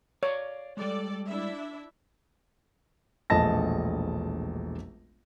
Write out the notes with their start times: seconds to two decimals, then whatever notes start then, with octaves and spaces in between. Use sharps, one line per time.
0.23 C#5 D5 F5
0.77 G3 G#3 A4 D5
1.26 D4 E4 E5
3.30 E1 A#1 A3 D#5 A5 A#6